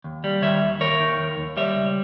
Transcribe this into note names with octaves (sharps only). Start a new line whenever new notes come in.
D#2
G3
D#3 C#5 E5
D#2
D#2 A#4 C#5
D#3
D#2
D#2
G3 C#5 E5
C#2